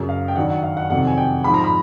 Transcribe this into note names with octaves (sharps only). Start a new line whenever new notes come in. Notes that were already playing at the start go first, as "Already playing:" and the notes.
Already playing: F#2 C#3 F#3
F5
G5
G2 D#3 F#3 F#5
F#5
F5
F#5
F2 C3 D#3 F#3 F#5
G#5
G5
G#2 F3 B5
A#5
B5